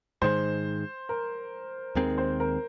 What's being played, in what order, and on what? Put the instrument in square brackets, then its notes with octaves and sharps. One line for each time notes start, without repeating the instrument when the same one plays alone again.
[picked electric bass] G#2 D#3 G#3 [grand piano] C5
[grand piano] A#4
[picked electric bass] D#2 D#3 G#3 C4 [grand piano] A#4
[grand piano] C5
A#4